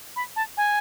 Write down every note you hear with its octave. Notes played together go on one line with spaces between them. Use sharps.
B5
A5
G#5